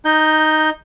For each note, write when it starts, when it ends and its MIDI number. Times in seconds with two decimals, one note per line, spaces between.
0.05 0.70 63
0.05 0.70 91